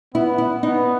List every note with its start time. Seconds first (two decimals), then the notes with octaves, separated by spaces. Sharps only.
0.14 B3 E4
0.38 E4
0.63 B3 D#4